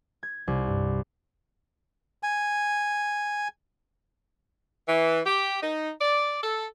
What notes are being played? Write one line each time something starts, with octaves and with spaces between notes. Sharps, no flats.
G#6
C2
G2
G#5
E3
G4
D#4
D5
A4